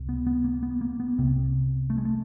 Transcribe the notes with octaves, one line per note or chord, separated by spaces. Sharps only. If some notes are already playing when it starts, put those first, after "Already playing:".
Already playing: C#2 C3
B3
B3
A#3
B3
A#3
B3
C2 C3
A3
G#3
A3